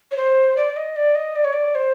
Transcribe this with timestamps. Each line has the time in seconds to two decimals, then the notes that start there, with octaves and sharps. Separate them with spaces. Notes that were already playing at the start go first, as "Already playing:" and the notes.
0.11 C#5
0.17 C5
0.56 D5
0.77 D#5
0.96 D5
1.15 D#5
1.36 D5
1.45 C#5
1.53 D5
1.75 C5